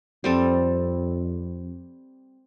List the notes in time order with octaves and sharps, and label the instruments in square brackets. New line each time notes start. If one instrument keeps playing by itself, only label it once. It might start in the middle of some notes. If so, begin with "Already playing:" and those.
[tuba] F2 [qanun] G3 C4 A4